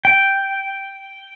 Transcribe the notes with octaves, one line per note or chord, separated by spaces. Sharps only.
G5